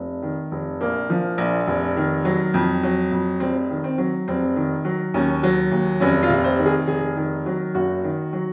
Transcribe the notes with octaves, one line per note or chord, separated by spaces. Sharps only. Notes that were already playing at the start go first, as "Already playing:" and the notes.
Already playing: F1
D#3
F1
A#1 A#3
F3
A#1
F1
D#3
F#3
F2
F#3
F2
F1 C4
D#3
C4
F#3
F1 C4
D#3
F#3
D#2 C#4
F#3
D#2
F1 C#4
F4
C3
C5
D#3
G#4
F1 G#4
D#3
F#3
F#1 F#4
D#3
F#3